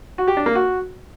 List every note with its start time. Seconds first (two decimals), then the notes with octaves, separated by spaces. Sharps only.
0.18 F#4
0.28 G4
0.37 D4
0.46 A#3
0.55 F#4